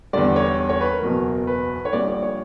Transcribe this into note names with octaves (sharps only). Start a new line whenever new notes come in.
E2 D3 G3 D5
C#5
C#5
B4
A#4
F#1 E2 B2 F#3
B4
C#5
A#1 A#2 G3 D5
D5
C#5